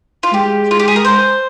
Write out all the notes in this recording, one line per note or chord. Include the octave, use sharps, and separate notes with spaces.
F4
G#3 G4
F4
G4
G#4
A#4
C5